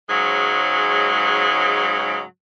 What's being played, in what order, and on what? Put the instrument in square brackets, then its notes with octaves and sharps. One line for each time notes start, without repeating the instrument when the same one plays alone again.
[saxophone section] G#2 C#3 F#3 G#3